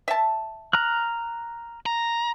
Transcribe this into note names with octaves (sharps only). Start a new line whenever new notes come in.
E5 A5
A#5 F6 F#6
A#5